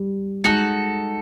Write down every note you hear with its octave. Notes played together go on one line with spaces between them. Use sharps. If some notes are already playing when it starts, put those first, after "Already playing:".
Already playing: G3
G#3 D#4 F#4 A4